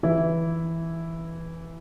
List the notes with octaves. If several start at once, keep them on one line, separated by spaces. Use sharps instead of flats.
E3 E4